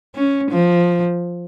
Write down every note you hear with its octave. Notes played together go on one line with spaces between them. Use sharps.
C#4
F3